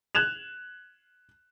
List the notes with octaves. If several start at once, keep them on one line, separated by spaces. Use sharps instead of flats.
F#6 G#6 E7 F7